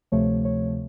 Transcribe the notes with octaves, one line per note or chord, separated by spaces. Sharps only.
D2 C3 F3 A3 C#5
C#5